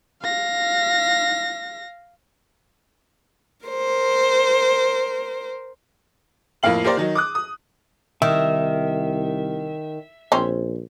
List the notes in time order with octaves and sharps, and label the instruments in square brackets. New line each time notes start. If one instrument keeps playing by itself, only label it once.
[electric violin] F5 A#6
[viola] A#4 C5
[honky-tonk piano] F2 A2 A#3 F5 F#7
A#3 G4 A#4 C5 D5
D#3 F#3 D#4
D6 D#6 F#6
D#6
[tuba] C2 [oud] D#3 [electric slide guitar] E5
[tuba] A#1 [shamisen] C4 C#4 C5